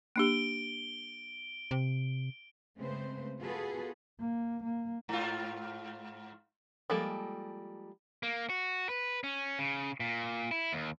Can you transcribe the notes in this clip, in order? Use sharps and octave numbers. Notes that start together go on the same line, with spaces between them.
A#3 D4 G4 D7 G7
C3
C#3 G#3 A3 C4 B4 C5
B3 F4 F#4 G#4 A4 B4
A#3
A#3
G#2 F4
F3 G3 G#3 A#3 A4
A#3
F#4
B4
C#4
C#3
A#2
E4
D#2